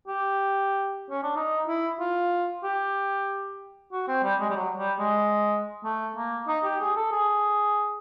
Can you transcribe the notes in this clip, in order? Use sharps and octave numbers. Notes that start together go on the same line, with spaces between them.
G4
C#4
D4
D#4
E4
F4
G4
F#4
C4
G3
G#3
G3
F#3
G3
G#3
A3
A#3
D#4
G4
G#4
A4
G#4